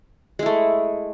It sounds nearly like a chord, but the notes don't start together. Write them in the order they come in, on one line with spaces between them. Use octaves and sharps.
G#3 E4 A3